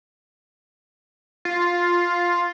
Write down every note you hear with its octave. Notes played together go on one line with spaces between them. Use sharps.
F4